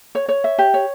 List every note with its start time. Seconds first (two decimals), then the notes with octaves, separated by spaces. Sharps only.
0.15 C#5
0.29 C#5
0.44 E5
0.58 G4
0.74 C#5